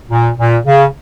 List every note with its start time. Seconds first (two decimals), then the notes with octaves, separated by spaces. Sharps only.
0.09 A#2
0.37 A#2
0.65 C#3